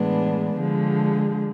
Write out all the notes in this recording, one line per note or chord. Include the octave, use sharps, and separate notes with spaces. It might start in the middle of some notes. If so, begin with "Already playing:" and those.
Already playing: A2 E3 G#3 B3 D4
D3 F3 G#3